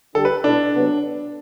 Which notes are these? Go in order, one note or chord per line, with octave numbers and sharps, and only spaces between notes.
D3 G3 D4 G4 A4
B4
B2 A3 D4 E4 A4
C3 F#3 B3